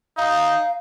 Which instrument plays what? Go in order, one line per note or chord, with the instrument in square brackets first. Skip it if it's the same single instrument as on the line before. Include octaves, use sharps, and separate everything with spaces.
[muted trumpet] D#4 [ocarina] F5